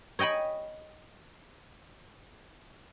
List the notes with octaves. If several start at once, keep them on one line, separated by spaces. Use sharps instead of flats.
C#5 D#5 G5 G#5 B5